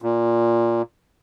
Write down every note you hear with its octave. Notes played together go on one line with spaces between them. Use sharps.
A#2